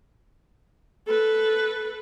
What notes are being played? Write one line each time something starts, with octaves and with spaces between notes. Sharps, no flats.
A4 B4